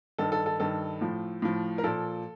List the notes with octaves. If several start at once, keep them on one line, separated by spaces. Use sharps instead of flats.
G2 D#3 A4
A4
A4
G2 D#3 A4
A2 F3
A2 F3
A#4
A#2 F3 A4